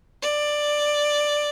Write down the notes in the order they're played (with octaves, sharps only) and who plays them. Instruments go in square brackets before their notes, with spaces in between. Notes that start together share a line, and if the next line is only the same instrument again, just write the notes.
[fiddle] D5